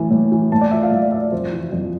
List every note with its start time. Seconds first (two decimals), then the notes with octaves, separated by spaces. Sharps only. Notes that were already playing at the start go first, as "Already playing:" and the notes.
Already playing: A2 E3
0.11 A2
0.32 E3
0.52 A2 A5
0.61 D5
0.71 F3 E5
0.83 F5
0.91 A2 E5
1.02 D5
1.12 F3 E5
1.22 D5
1.32 F2 C5
1.53 E3
1.72 F2